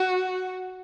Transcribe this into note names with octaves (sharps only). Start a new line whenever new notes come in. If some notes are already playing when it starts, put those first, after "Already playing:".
Already playing: F#4